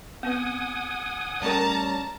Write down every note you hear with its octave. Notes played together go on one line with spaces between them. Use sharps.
B3 C4 B4 F#5 G#5 D#6
G3 C#4 A#4 A5 A#5